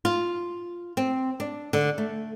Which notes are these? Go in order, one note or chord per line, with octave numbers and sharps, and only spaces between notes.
F4
C4
D4
D3
A3